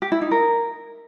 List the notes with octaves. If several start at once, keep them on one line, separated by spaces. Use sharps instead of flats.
G4
E4
D#4
A#4